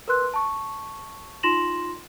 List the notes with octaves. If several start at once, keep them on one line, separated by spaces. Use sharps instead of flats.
A#4 B4 C6 F#6
A5 C#6
D#4 F4 C6 A#6 E7 F#7